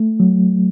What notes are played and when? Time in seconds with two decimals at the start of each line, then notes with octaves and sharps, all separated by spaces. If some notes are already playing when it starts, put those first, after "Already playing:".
Already playing: A3
0.20 F#3